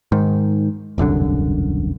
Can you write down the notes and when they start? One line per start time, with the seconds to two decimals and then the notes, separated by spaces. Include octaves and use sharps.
0.12 G#2 D#3
0.98 E1 C2 F#2 D3